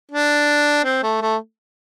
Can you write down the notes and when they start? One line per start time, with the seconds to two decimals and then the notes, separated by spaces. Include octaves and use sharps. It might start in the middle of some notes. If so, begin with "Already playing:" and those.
0.12 D4
0.84 C4
1.03 A3
1.22 A3